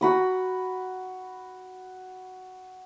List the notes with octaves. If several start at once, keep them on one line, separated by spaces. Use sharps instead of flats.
F#4 B5 D#6